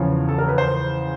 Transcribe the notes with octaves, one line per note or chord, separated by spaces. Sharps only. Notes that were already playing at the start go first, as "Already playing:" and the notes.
Already playing: E2 C#3 F3 C#5
A4
A#4
B4
C5